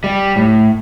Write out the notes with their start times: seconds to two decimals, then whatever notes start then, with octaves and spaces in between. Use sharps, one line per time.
0.04 G3
0.36 A2